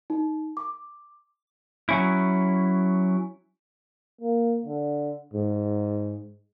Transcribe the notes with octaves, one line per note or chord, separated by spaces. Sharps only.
D#4
D6
F#3 C#4 E4
A#3
D3
G#2